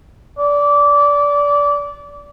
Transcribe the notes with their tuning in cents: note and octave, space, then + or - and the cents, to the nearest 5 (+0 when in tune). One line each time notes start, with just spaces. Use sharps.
D5 -20